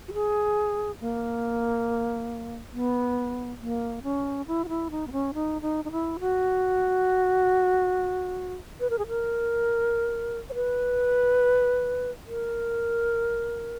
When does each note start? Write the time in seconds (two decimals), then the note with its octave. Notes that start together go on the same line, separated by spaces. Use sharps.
0.08 F#4
0.14 G#4
1.01 A#3
2.73 B3
3.61 A#3
4.03 C#4
4.47 E4
4.64 F#4
4.69 E4
4.91 D#4
5.07 B3
5.12 C#4
5.34 D#4
5.62 D#4
5.85 D#4
5.92 E4
6.20 F#4
8.80 B4
8.90 A#4
8.99 G#4
9.08 A#4
10.50 C#5
10.54 B4
12.27 A#4